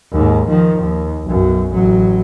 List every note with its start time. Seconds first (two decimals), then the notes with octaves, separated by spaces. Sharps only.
0.12 D#2 G#2
0.49 D#3 F3
0.82 D#2
1.26 B1 F#2
1.72 A1 F#3